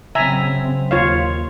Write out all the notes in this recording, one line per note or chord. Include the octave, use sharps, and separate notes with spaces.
C#3 F#3 C4 E5 G#5 A#5
D#2 F4 C#5 F5